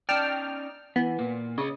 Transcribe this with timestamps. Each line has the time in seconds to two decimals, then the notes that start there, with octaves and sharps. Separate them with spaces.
0.09 C#4 D#4 D5 G5 A5 F6
0.96 E3 B3
1.19 A#2 A#3
1.58 C#3 C#5 D#5